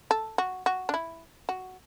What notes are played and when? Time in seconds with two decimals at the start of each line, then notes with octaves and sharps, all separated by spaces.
0.11 A4
0.38 F#4
0.66 F#4
0.89 D4
0.94 E4
1.49 F#4